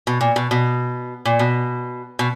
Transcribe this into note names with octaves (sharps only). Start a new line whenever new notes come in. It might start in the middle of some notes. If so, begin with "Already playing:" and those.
B2
A#2
B2
B2
A#2
B2
B2